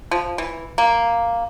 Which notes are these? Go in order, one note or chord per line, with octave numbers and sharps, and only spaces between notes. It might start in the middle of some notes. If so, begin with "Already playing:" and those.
F3
E3
A#3